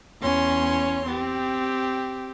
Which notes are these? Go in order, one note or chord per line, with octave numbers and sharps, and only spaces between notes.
E2 C#4 C#5 C6
C4 G4